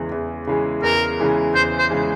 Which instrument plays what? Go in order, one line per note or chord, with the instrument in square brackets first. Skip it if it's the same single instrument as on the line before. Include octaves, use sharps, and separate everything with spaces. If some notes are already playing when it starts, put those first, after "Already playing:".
Already playing: [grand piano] E2 C#3 E3 G#3
E2
C#3 E3 G#3
[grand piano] E2 [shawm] A#4
[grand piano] C#3 E3 G#3
[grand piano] E2 [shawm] C5
[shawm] C5
[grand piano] C#3 E3 G#3